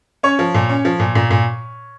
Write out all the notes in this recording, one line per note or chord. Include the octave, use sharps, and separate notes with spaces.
C#4 C#5
F3
A#2
C#4
F3
A#2
A#2
A#2